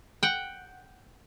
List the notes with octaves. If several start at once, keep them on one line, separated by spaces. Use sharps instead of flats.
F#5 G5